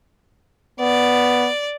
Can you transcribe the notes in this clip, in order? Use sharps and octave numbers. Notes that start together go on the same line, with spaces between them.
B3 D5